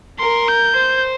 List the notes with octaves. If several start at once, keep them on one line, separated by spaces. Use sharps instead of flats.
A#4 C6
G6
C5